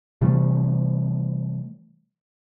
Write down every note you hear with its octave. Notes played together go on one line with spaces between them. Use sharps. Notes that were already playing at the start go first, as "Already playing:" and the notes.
C3 E3 G3 A3